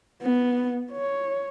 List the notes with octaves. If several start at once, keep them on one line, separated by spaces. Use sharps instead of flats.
B3
C#5